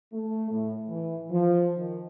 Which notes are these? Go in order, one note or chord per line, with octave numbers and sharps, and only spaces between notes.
A3
A2
E3
F3
D#3